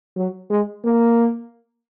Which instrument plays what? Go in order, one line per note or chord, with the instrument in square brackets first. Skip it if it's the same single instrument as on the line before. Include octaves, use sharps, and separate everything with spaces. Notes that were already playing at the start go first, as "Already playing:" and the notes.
[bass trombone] F#3
G#3
A#3